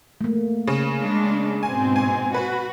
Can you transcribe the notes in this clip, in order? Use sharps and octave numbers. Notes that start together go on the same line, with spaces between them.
A3 A#3
C#3
G#3 D4
G#2 B2 C4 G#5
G#5
F#4 B4